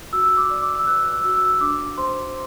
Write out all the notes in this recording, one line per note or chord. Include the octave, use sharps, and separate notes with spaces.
F#4 E6
D6
D5
D6
E6
B4 F#6
E6
F#4
E6
D4 D6
C5 C6